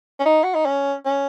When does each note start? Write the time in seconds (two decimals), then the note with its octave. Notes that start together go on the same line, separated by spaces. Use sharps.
0.20 C#4
0.25 D#4
0.44 F#4
0.54 D#4
0.66 C#4
1.06 C#4